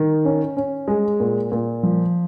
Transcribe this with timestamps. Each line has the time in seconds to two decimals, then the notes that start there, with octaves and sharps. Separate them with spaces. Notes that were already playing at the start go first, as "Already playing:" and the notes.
Already playing: D#3
0.25 C#4
0.57 C#4
0.88 G#3
1.20 A#2
1.52 A#2
1.83 F3